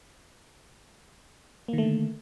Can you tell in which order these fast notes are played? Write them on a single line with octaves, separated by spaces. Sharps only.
A#3 D#3 A3 D3